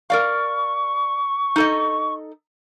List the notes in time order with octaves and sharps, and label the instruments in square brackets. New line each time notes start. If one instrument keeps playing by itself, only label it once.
[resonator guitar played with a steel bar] A#4 D5 F5 [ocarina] C#6
[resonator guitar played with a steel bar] D#4 A4 D#5